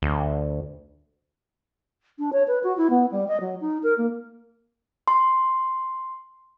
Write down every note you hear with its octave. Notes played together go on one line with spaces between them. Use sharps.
D2
D4
C#5
B4
F#4
E4
B3
G3
D#5
F#3
D#4
A#4
A#3
C6